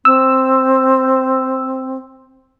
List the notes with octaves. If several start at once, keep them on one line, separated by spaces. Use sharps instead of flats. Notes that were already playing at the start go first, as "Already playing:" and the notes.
C4 E6